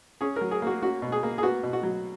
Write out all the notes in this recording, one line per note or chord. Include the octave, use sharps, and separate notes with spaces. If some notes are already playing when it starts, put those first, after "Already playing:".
C#4 G#4
F#3 A#4
G#4
A#3 F#4
C#4 F#4
B2
G#4
A#3
G#4
B3 F#4
B2
F#4
F#3